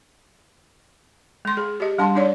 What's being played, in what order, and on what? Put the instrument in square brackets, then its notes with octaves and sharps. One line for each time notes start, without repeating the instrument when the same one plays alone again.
[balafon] G#3 C6
G#4
G4 D#5
G3 D4 A5 C6
D4 D#4 C#5 D5